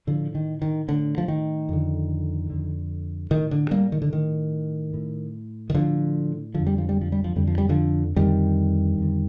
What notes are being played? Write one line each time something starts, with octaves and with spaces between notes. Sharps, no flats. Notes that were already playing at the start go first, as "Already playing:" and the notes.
A2 D3 F3
D#3
D#3
A2 D3
F3
D#3
F2 D3
F2 D3
A2 D#3
D3
G3 A#3
D#3
D3
A2 D#3
A2
D#3
A2 D3 F3
F2 D3 F3
G3
F3
G3
F3
G3
F3
F2 D3 G3
F3
G3
D3 F3
F2 D3 D#3 G3
F2 D3